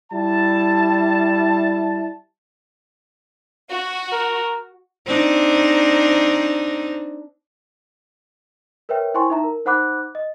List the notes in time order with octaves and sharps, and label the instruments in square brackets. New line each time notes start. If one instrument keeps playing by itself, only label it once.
[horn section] G3 E4 A5
[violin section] F#4
[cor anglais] A#4
[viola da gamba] C4 D4 D#4
[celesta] A#4 B4 C#5 E5 G5
E4 C5 G5 G#5 C6 C#6
D#4 E5 A#5
A#4
D#4 C5 F#5 B5 D6 F#6
D#5